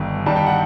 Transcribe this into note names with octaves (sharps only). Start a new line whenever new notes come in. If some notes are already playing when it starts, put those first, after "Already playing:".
Already playing: G1 G2 D#3
G2 D#3 G3 A5
G5
F#5